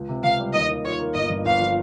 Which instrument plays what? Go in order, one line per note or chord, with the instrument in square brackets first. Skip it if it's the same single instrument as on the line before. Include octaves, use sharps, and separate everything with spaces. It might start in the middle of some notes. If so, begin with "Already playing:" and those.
Already playing: [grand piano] C#2
C3
[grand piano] C#2 [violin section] F5
[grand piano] G3
[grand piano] D#2 [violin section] D#5
[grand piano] D#3
[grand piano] F4 [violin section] C#5
[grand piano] A#3
[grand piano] G1 [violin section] D#5
[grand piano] G2
[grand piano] G1 [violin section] F5
[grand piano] F3